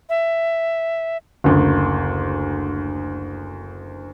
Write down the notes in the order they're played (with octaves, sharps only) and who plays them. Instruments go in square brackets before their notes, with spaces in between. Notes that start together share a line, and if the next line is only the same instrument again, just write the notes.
[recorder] E5
[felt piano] F#1 D2